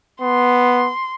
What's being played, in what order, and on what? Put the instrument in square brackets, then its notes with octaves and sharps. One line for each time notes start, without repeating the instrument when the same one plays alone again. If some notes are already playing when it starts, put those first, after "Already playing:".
[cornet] B3 [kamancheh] C6